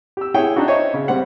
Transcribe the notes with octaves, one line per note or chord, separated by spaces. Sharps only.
G4 E6
E4 G#4 C#5 G5
D4 D#4 F4 F#4
C5 C#5 D#5 E5 C#6
C#3
G3 C4 F#5